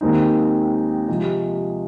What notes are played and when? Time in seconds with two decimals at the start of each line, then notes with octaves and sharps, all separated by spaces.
0.01 D#2 D#3 G#3 C4 D#4
1.08 C3 F3 G#3